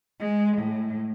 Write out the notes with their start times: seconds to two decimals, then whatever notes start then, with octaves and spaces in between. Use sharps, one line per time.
0.20 G#3
0.57 A2